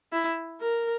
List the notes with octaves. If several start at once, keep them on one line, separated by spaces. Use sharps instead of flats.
E4
A#4